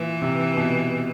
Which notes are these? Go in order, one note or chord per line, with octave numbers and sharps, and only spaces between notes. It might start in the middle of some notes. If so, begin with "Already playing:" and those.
Already playing: A#2 E3
C3
B2